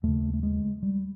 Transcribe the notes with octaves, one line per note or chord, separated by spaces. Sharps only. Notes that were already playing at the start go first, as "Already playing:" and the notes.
D#2 C#3 A3
A3
G#3
G3